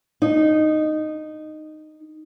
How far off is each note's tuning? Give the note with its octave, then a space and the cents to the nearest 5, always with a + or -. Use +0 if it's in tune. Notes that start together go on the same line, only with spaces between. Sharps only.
D#4 -10